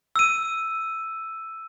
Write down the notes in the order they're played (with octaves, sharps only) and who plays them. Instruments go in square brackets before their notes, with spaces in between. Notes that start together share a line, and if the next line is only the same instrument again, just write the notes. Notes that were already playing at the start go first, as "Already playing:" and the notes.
[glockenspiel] E6 D#7